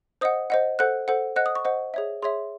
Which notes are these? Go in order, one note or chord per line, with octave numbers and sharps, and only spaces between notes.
C5 D#5 F#5 D#6
C5 D#5 F#5
A4 C5 F#5 F#6
A4 C5 F#5
C5 D#5 F#5 F#6
D#6
C#6
C5 D#5 F#5
G#4 C#5 E5
G#4 C#5 E5 C6